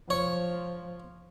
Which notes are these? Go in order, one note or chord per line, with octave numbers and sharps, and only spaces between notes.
F3 C#5